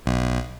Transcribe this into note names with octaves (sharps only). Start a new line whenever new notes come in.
B1